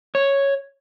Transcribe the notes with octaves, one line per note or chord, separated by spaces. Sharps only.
C#5